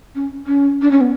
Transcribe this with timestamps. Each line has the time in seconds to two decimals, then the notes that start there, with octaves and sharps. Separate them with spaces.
0.15 C#4
0.47 C#4
0.82 D4
0.91 C#4
1.01 B3